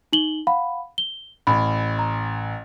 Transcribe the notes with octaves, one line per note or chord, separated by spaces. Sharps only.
D#4 F#7 G7
F5 F#5 B5
G7
A1 B5
A#5